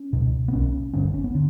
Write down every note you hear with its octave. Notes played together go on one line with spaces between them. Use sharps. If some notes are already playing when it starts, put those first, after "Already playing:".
Already playing: C#4
C#2 B2
B3
B1 B2 C#4
G1 G2 D3 C#4
C#4
B3
D3